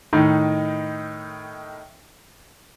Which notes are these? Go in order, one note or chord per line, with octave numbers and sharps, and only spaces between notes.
A2 D#3 D#4